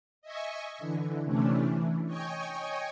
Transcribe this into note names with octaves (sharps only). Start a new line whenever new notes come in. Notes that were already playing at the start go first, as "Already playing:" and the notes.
D#5 E5 G#5 C#6
D3 E3
C3 E3 A3 C#4 D4
E3
C#5 D#5 G5 G#5 C#6